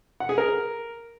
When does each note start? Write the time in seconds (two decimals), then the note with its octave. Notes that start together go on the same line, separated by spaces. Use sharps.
0.20 F#5
0.29 G#4
0.38 A#4